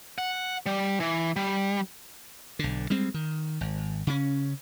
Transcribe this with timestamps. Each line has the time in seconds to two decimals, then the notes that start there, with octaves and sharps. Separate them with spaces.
0.18 F#5
0.66 G3
1.00 E3
1.36 G3
2.59 B1 D3
2.90 G3 G#3 C4
3.14 D#3
3.61 G#1
4.07 C#3 C#4